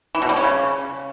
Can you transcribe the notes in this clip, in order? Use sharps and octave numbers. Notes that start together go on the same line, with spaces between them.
E3
B2
G3
C#4
C#3